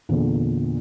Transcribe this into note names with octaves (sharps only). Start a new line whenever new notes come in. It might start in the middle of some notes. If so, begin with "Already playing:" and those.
E2 A#2 D3